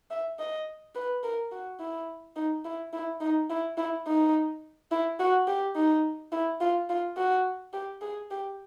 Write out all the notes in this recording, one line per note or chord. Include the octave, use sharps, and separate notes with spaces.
E5
D#5
B4
A#4
F#4
E4
D#4
E4
E4
D#4
E4
E4
D#4
E4
F#4
G4
D#4
E4
F4
F4
F#4
G4
G#4
G4